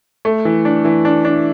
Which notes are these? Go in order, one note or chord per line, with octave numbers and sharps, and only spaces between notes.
A3
E3
D4
E3
D4
D4